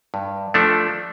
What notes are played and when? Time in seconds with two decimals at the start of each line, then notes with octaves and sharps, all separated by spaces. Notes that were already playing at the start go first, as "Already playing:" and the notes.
0.14 G2
0.54 F3 A3 D4 A4